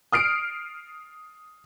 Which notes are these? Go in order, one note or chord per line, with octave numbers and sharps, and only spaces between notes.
D#6 F6 C7 D7